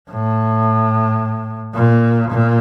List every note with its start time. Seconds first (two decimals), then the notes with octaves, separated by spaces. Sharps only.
0.11 A2
1.75 A#2
2.31 A#2